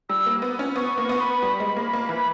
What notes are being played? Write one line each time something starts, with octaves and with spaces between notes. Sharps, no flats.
G3 E6
A#3
B3
C#4
B3 C#6
A#3 C#6
B3
B5
G3
G#3
A#3
A#3
E3 B5